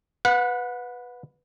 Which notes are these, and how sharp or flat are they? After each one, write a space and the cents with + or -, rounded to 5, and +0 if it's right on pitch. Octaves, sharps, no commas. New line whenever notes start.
B4 +0 F#5 -30